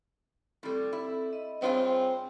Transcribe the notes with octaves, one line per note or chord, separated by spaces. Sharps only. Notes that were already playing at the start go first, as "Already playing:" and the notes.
A2 G3 C4 A4
E4
D#5
G2 C4 F4 G#4 C#5